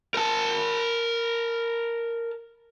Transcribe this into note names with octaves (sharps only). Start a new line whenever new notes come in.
A#4 A5